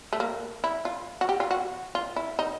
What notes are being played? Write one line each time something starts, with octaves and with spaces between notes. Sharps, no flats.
A3
A#3
E4
F4
F#4
G4
F4
F#4
F4
E4
D#4